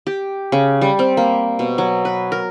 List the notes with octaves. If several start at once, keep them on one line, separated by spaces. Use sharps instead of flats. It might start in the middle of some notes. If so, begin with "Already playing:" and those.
G4
C#3
G3
C4
A#3
B2
F#3
B4
A#4